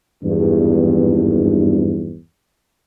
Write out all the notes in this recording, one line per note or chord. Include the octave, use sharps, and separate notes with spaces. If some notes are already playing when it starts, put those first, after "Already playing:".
G#1 E2 G2